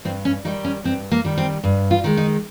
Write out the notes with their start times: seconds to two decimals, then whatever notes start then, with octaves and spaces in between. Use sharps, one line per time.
0.05 G2 C4
0.25 C#4
0.45 D#3 G3 D#4
0.64 C#4
0.84 G2 C4
1.11 A#3
1.24 D#3 G3
1.38 C4
1.64 G2
1.91 F4
2.04 D#3 G#3
2.17 D#4